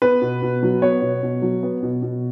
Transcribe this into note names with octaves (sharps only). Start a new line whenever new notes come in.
B3 B4
B2
B2
F#3
B3 C#5
B2
B2
F#3
B3
B2
B2